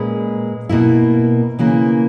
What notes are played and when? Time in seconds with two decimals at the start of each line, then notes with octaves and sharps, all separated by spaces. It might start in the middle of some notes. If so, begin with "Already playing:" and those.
Already playing: A#2 G#3 C#4 G#4 B4
0.69 B2 A#3 E4
1.59 C#3 E3 A#3